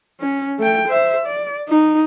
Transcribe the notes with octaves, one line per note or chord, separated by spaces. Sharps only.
C#4
A3 G5
C5 E5
D5
D#4